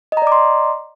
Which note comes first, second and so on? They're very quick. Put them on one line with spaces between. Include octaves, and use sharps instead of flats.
D#5 A#5 D5 D6 C6